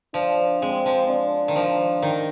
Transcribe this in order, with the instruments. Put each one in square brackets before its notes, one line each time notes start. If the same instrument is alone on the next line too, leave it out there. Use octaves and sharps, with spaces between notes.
[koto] F3 [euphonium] D4
[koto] G#3 [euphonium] C4
[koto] F3
[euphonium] D4
[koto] D#3
F3
D#3